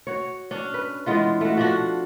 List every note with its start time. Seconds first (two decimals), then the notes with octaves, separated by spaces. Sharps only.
0.07 F#4 C#5
0.51 C#4 D4
0.74 B4
1.06 E3 G#3 B3 F4
1.41 A3 F#4
1.57 F3 D4 F#4